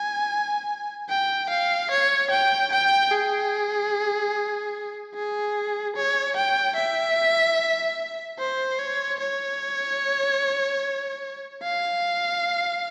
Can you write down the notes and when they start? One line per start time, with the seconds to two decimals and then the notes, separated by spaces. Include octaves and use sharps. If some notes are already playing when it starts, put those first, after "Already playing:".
Already playing: G#5
1.09 G5
1.50 F5
1.91 C#5
2.31 G5
2.72 G5
3.12 G#4
5.15 G#4
5.96 C#5
6.36 G5
6.77 E5
8.39 C5
8.79 C#5
9.20 C#5
11.63 F5